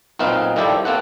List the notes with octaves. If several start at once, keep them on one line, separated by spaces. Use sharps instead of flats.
B1 A#2 C4 D#4 B4 F5
D#3 F3 G3 E4 G4 A4
A#3 C4 A4 F#5